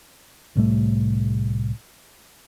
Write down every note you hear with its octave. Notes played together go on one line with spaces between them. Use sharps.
C2 A2 G3 A3